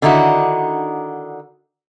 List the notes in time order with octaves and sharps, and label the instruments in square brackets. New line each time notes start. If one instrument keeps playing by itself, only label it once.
[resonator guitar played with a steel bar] D3 D#3 D#4 E4 F#4